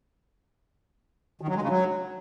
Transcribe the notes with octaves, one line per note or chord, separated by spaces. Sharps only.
D#3
F#3
G#3
C#3
F#3